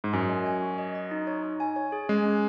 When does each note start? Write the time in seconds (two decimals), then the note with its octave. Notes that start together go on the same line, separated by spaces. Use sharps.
0.04 G#2
0.13 F#2 G#5
0.29 D#5
0.46 G#5
0.62 F#4
0.78 D#5
0.95 D#5
1.11 D#4
1.27 C#5
1.43 D#4
1.60 G#5
1.76 C#5
1.92 G#4
2.09 G#3 C#4
2.25 C#4